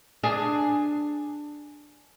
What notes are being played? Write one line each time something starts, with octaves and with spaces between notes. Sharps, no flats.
D4 G#4